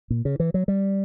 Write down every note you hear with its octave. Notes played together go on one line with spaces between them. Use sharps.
A#2
C#3
E3
F#3
G3